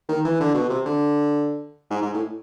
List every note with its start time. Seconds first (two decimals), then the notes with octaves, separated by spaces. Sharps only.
0.09 D#3
0.25 E3
0.40 D3
0.55 B2
0.70 C3
0.86 D3
1.91 G#2
2.02 G#2
2.14 A2